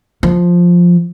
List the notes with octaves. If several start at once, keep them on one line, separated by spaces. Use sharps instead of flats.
F3